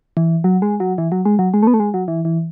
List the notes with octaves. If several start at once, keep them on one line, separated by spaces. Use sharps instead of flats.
E3
F#3
G#3
F#3
E3
F#3
G#3
F#3
G#3
A3
B3
A3
G#3
F#3
E3
E3